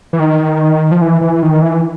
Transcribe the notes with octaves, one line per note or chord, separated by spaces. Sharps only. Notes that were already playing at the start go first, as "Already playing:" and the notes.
E3
D#3
F3
E3
E3
D#3
E3